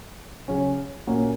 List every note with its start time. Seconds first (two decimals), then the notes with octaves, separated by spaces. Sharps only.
0.48 C#3 F#3 C#4
1.07 A#2 A#3 C#4 F#4